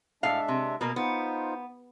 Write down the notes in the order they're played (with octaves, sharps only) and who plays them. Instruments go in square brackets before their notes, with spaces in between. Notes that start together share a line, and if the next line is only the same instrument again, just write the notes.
[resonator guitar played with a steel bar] A2 F5 [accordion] G#3 D4 E5
[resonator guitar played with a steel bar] C3
[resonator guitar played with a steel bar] B2 A#3 [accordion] A#4
[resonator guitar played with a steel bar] B3 [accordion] D#4 F4 C5